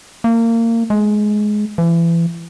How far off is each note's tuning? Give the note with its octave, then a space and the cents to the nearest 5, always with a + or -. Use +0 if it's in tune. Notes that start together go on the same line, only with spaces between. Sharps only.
A#3 -25
G#3 +15
E3 +30